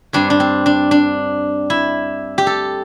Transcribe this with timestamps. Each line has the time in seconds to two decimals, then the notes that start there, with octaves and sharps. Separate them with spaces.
0.13 G2 G3 C4 D4
0.30 D4
0.40 C4
0.66 D4
0.91 D4
1.70 E4
2.38 G4
2.47 A4